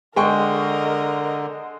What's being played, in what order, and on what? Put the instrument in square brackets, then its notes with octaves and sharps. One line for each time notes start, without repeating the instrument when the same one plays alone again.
[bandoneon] D3 [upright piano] G#3 G5 C#6 [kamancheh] A#4 D#5